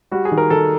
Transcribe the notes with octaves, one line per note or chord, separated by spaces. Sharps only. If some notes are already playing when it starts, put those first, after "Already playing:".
G3 F#4
G#4
D#3
A#4
D#3 A4